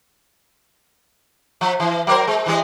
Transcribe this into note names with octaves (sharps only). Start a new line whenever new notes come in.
F3
E3
F#3 A#4 C5
G#3
E3 G3 D#5